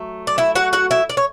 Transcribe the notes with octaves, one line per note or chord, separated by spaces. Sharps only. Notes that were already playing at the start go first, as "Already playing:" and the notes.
Already playing: F#3 A3
D5
E4 E5
F#4 F#5
F#4 F#5
E4 E5
D5
C#5